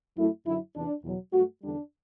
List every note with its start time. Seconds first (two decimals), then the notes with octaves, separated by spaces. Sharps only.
0.17 F#2 F#3 A3 E4
0.46 F#2 D3 F#3 E4
0.75 E2 C3 E3 D4
1.04 E2 B2 F#3
1.33 G2 F#3 A3 F#4
1.62 E2 D3 G3 D4